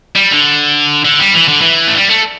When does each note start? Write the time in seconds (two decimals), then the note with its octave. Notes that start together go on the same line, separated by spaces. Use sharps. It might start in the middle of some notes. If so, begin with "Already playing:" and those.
0.16 G3
0.31 D3
1.05 D3
1.20 G3
1.34 E3
1.48 D3
1.61 E3
1.88 A3
1.95 G3
2.10 A3